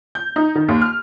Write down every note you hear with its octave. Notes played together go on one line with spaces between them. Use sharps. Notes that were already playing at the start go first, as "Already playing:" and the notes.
G6
D#4
D#3
D#2
F6